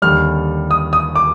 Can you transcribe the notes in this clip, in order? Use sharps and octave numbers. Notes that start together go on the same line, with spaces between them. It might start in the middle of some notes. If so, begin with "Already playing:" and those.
D#2 D3 G3 F6
D#6
D#6
D6